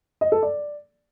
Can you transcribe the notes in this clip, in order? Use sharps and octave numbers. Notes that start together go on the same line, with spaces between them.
D#5
A4
D5